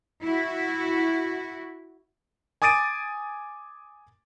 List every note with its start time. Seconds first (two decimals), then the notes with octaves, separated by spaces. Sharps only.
0.23 E4 F#4
2.62 G#5 D6 D#6 A6 D7 D#7